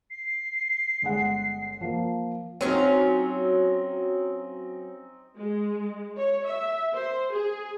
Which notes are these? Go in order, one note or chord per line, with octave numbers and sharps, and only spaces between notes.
C7
G1 G#3 F#5
F3 A#3
F#3 C4 C#4 D#4 F4
G#3
C#5
E5
C5
G#4